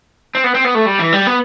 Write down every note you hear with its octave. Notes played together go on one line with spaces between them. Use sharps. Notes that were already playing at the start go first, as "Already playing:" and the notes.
C4
B3
C4
B3
A3
G3
E3
G3
B3